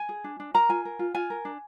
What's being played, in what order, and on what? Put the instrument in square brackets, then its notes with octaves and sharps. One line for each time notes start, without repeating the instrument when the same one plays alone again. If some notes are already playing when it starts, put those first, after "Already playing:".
Already playing: [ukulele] G#5
G#4
D4
D4
A#4 A#5
F4 G#5
A#4
F4
F4 G#5
A#4
D4